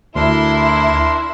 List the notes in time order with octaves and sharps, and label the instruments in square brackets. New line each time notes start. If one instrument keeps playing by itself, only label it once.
[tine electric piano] D2 [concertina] D4 A#4 [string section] E4 [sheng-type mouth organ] C6